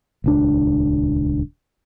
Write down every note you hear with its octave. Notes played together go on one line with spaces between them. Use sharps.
D#1 C#2 D4